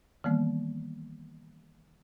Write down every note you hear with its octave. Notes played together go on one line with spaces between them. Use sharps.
D#3 E3 G3 A#3 B3